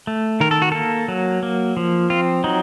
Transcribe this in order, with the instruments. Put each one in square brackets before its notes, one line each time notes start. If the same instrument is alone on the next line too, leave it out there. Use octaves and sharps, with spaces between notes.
[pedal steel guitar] A3
D#3 A#4
A4
F#4
A#3 A4
F#3
A#3
F3
C4 F4
F#3 D#4